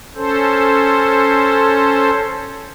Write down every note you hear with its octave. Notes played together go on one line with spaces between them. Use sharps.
C#4 A4 C5